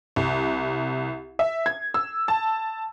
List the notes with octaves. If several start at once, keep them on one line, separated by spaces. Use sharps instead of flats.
C2
E5
G#6
E6
A5